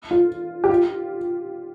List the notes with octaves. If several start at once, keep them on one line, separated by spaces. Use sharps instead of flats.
F4
G4
F4